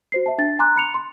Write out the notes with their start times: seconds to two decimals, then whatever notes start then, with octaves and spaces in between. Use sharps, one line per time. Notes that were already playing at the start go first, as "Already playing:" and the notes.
0.12 F#4 C5 C7
0.26 E5 A5
0.38 D4 A6
0.59 G#5 A#5 C6 D6 F#6
0.76 B5 C#7 F7
0.94 C6